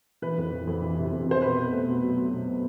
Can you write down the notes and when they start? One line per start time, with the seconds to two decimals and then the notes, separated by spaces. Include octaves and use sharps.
0.22 E3 B4
0.38 F2
0.52 E3
0.67 F2
0.82 E3
0.96 C3
1.12 F2
1.27 C3 C5
1.42 B2 B4
1.57 B2
1.71 A3
1.87 B2
2.01 F#3
2.16 F#3
2.32 B2
2.46 B2